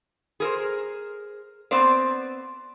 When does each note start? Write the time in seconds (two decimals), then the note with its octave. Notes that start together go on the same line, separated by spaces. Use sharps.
0.40 G#4 A#4 C5
1.71 B3 C4 C5 D5